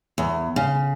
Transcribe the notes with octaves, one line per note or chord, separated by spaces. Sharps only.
E2
C#3